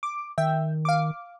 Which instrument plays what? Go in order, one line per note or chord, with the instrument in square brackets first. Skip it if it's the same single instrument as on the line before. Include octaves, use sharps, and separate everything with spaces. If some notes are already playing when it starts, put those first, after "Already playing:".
[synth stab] D6
[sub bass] D#3 [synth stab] E5 G5
[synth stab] F5 D6